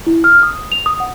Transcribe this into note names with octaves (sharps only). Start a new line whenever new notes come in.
E4
F6
D#6
F7
D#6
F#5